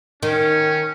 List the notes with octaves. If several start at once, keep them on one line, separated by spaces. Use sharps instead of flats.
D#3 C#4